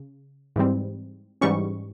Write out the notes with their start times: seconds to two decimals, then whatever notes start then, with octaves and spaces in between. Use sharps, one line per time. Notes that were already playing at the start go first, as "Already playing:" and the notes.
Already playing: C#3
0.56 G#2 E3 G3 C4
1.41 G#2 E3 G3 C#4 C#6